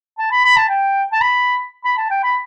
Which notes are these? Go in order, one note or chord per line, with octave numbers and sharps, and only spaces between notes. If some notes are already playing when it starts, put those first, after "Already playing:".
A5
B5
B5
A5
G5
A5
B5
B5
A5
G5
B5